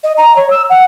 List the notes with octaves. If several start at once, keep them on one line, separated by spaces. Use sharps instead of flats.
D#5
A#5
C#5
E6
F#5